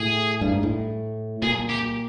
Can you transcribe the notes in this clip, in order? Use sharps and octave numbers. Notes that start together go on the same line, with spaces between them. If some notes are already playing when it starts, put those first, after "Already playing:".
Already playing: A2 G#4
G2
G#2
A2
A#2 G#4
G4